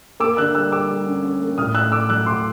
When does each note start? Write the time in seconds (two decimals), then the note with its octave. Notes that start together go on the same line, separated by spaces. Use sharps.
0.20 A#3 D6 E6
0.37 D3 E6 F#6
0.54 G3 E6 F#6
0.72 G3 D6 E6
0.89 G3
1.06 C#4
1.24 C#4
1.41 A#3
1.58 A2 D#6 F6
1.75 A3 E6 F#6
1.92 A3 D6 E6
2.09 F#3 E6 F#6
2.26 A2 C6 D6